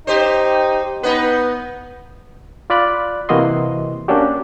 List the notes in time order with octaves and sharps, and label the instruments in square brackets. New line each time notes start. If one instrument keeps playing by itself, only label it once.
[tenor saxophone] D#4 [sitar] G4 C5
[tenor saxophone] B3 [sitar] D#4 B4
[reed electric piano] F4 D5 B5 F#6
C3 E3 A#3 F#4 D#5 C6
A#3 C#4 D4 F#4 G4